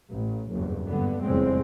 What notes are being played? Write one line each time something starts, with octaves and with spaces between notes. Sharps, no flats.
A1
F#1 E2 G2
G2 D3 B3
F1 E2 A2 G3 G#3 C4